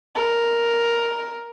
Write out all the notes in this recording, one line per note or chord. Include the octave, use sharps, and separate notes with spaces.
A#4